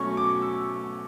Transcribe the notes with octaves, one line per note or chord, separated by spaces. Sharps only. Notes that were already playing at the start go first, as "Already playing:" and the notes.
Already playing: B2 F#3 A3 C#4 C#6
D6
E6